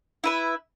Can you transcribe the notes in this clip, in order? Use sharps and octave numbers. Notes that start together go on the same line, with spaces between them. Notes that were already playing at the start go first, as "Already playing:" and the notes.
E4 B4 E5